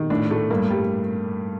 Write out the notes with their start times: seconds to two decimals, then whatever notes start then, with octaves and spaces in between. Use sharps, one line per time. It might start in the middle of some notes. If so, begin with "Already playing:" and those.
Already playing: D#3
0.10 A2 D4
0.31 A3
0.50 G2 A#3
0.70 G3